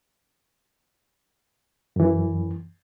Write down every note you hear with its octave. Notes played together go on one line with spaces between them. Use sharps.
F#2 E3